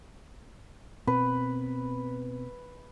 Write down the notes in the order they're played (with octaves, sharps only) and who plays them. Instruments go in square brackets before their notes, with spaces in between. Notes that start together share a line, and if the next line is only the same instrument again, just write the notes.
[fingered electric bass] B2 C4 [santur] B4